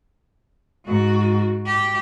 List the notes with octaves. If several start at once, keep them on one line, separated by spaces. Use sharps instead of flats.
G#2 F#4
G4